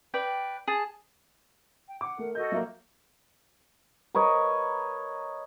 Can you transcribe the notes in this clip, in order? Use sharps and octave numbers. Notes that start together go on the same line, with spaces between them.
B4 D5 G5
G#4 A5
G5
F#5 D6
A3 A#4
F#4 A4 D#5 G6
F#3 A#3 E5
A#4 B4 C#5 D#5